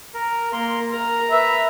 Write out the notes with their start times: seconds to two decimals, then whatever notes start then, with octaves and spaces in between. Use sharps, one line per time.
0.14 A#4
0.53 A#3 A#4 C6
0.92 A#4 A#5
1.31 B4 E5